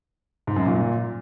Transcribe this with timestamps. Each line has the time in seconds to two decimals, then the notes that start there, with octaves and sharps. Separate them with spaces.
0.47 G#2
0.56 F#2
0.65 A#2